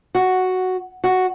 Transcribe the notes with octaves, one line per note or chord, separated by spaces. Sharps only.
F#4
F#4